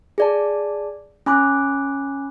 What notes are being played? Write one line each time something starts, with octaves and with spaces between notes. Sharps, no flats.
G#4 D5 A5
C#4 G#5 B5 D6 F#6